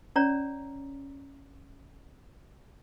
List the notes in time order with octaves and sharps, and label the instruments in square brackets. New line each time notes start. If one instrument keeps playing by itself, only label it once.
[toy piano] C#4 C#5 D5 A#5